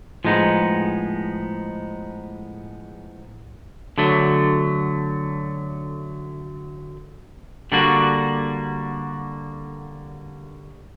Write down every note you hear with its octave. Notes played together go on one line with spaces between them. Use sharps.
A2 F3 G#3 B3 D#4
D3 F#3 A3
D3 G3 A#3 D4 F#4